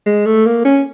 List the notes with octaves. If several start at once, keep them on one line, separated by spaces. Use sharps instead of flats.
G#3
A3
A#3
C#4